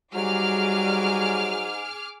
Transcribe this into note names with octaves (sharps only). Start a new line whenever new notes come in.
G#2 F#3 G3 G#4 D6 F6